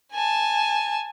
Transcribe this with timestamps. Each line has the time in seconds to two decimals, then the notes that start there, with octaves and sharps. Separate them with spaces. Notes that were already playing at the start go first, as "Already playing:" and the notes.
0.13 G#5 A5